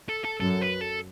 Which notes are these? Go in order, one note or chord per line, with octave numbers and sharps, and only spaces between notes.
A4
A4
F#2 A4
B4
A4